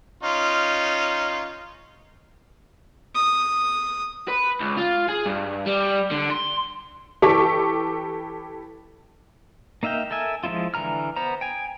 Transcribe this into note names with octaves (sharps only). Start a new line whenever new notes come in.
C#4 D#4 F4
D#6
B4
C#2
F4
G#4
G2
G3
D3
C6
E3 G4 A4 C#6 D6 B6
A#3 D#4 E5 F5 G5
A4 A#4 E5 G#5
F3 G#3 B3 E4 F4
D3 E3 A#5 F6
B3 C5 A#5
G5 G#5